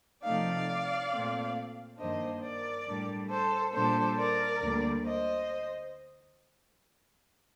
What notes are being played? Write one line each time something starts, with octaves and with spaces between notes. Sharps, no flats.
C3 F3 A3 D#4 D5 F5
A#2 A3 C4
G2 D#3 A#3 D4 C5 D#5
A#4 D5
A2 G3 D4
A4 C5
A#2 G3 D4 A4 C5
A#4 D5
D2 D3 G3 A#3
C5 D#5